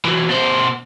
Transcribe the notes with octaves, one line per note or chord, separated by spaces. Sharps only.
E3 F#3
B2 C5